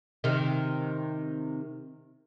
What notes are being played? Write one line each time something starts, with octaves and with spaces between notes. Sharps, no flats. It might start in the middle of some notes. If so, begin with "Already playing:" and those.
C3 D#3